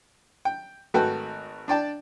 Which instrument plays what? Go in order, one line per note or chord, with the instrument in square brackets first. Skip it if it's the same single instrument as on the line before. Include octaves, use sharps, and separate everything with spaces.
[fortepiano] G5
G#1 A3 F#4 A4 B4 G5
D4 D5 G5 A5